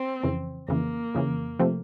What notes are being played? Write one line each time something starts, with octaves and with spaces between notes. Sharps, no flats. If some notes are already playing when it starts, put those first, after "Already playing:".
Already playing: C4
F2 C#3 E3
F2 C#3 E3 A#3
F2 C#3 E3
C3 F3 A3 C4